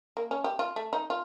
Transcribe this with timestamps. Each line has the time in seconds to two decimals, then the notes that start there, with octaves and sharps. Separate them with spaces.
0.17 A#3
0.31 C#4
0.44 G4
0.59 F4
0.76 A3
0.93 D#4
1.10 F4